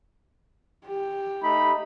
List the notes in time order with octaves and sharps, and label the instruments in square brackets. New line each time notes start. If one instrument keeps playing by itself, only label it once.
[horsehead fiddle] G4
[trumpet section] A3 D#4 B5